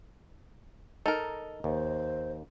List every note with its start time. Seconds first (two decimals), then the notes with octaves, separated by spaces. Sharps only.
1.06 D#4 A4 A#4
1.64 D#2 C5